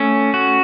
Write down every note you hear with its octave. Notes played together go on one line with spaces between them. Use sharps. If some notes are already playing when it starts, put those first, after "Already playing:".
Already playing: A3 C#4
F#4